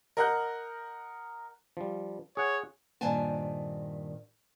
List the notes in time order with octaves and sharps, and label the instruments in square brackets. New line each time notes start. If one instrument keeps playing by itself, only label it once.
[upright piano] A#4 D#5 F#5 A#5 F#6 G6
[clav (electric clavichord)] F3 G3
[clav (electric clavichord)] G#4 F#5 [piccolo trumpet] C#5
[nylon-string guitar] G2 A#2 D#3 C5 G#5 A5